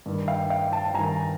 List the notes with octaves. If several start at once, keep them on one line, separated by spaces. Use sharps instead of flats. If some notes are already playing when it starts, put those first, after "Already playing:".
G2 D#3
F5 G5
F5 G5
G5 A5
G2 D#3 G#5 A#5